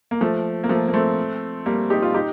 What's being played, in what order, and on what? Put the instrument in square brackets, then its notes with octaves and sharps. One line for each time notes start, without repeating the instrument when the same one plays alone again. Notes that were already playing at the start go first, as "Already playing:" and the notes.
[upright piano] A#3
F3 A3
A#3
F3 A3
A#3
A3 C4
G3 A#3
D#4 G4
F4
D#4 G4